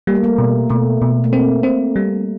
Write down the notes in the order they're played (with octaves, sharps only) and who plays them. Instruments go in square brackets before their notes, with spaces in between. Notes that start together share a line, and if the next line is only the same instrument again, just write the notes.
[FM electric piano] G3 [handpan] A#3
[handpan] A3
A#3
[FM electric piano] B2
[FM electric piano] B2 [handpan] A3
[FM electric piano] B2
[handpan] A3
[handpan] A#3 [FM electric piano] C4
[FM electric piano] C4
G3